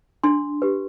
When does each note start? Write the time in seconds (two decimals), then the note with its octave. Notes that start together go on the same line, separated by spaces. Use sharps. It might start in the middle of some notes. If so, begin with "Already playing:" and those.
0.24 D4 C6
0.62 G4 B4